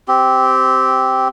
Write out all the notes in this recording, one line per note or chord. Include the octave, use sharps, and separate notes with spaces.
C4 G4